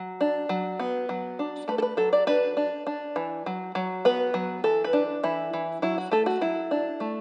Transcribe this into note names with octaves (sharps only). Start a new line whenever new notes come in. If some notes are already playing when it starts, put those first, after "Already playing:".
Already playing: F#3
D4
F#3
B3
F#3
D4
A3 B4
A4
B4
F#3 A4
D5
D4 B4
D4
D4
E3
F#3
F#3
B3 B4
F#3
E3 A4
B4
D4
E3 E4
E3
F#3 E4
F#4
A3 A4
F#4
F#3 E4
D4
A3